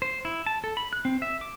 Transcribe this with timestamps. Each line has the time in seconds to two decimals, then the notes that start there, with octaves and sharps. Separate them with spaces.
0.02 C5
0.25 E4
0.46 A5
0.64 A4
0.77 B5
0.93 F#6
1.05 C4
1.22 E5
1.41 D6